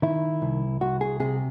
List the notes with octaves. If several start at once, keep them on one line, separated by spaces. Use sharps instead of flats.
D#3 E4
C2
C2 F#4
G#4
C3 G#4